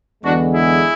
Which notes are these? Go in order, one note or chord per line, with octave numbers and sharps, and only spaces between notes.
E2 D3 G#3 B3 D4 F#4
E4 G#4